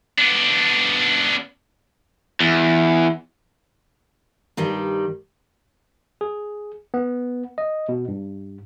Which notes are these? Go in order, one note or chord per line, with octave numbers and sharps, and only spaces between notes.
B3 D4
E2
G2 D#3 G3
G#4
B3
D#5
B2
G2